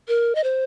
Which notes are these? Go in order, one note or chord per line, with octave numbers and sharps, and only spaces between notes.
A#4
D#5
C5